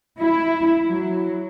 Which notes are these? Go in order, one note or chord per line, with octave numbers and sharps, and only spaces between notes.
E4
F#3